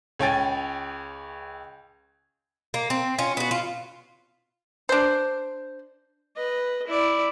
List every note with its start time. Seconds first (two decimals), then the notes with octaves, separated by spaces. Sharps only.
0.19 C#2 C#5 G5 G#5 A6
2.74 A#3
2.90 C4
3.19 C#4 F4
3.37 B3 F#4
3.51 F4
4.89 D4 C5
6.36 B4 D#5
6.87 E4 D5